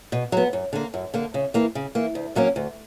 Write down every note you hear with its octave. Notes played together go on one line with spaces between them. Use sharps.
B2
F#3 B3
F#2
D3 A#3
F#2
D3 A#3
C#3
E3 A#3
C#3
E3 A#3
D2
C#3 F#3 A#3 C#4
D2